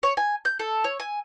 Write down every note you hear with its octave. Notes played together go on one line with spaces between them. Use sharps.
C#5
G#5
G6
A4
C#5
G#5